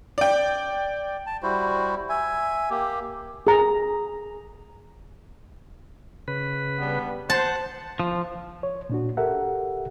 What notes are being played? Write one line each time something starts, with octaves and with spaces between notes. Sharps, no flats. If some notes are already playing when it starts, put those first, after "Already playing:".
D5 G5
A5
G3 E4 F#4 C5
E5 G#5
A#3 G4
G#4 A#5
C#3 B4
G3 B3 D4
C5 F#5 A5
F3
C#5
A#2 D4 F#4
G4 A4 A#4 E5 F#5